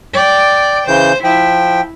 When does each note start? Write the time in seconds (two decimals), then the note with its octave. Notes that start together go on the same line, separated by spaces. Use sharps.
0.13 D5 G5
0.88 C#3 E3 C5 G6
1.24 F3 E4 G5